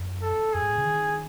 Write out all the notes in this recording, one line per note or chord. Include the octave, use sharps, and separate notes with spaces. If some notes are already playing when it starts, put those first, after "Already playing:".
Already playing: F#2
A4
F#2 G#4
G#2
A2
C#3
D#3